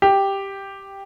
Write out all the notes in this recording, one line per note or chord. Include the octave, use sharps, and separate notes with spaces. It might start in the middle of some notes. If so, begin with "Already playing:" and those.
G4